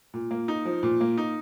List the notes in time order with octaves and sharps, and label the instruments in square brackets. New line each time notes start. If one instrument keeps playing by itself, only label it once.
[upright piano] A#2
A#3
D#4
F3
A#2
A#3
D#4